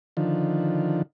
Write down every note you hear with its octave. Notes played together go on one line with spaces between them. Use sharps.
D3 D#3 F3